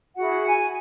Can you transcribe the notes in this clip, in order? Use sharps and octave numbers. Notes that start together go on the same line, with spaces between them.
E4 F#4 G#4 F#5
G#5